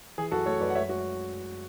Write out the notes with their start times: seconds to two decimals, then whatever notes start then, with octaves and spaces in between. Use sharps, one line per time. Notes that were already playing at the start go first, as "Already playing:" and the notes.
0.18 E3 G#4
0.31 F#2 F#4 A4
0.46 A3 A4 C#5
0.61 F#2 B4 D5
0.70 F#5
0.75 G#3 C#5 E5
0.89 G#3 F#4